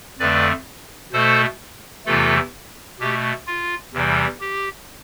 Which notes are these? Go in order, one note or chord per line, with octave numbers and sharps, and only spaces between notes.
F2 D3 A3 B4 D5
B2 A3 A4 C5
E2 C3 E3 A3 F4 A4
B2 A3 G4
F4
E2 C3 E3 G3
G4